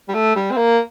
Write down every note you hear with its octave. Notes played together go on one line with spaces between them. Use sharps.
G3
A3
G3
C4
A#3